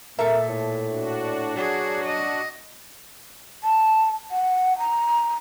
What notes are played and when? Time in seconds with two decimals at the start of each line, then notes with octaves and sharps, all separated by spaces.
0.19 A#2 A4 A#4 E5
0.49 A2
0.90 D4 F#4
1.56 F#3 G#4
2.05 D#5
3.64 A5
4.31 F#5
4.79 A#5